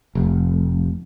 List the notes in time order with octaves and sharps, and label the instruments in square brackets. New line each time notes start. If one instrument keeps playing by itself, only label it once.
[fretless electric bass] F1